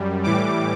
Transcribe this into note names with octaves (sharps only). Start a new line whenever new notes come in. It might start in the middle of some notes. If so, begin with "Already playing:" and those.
Already playing: F#2 G3
A2 E3 G3 D6